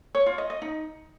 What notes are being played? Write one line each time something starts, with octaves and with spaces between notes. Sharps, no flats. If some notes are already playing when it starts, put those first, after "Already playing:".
C#5
F4
D#5
D#5
D#4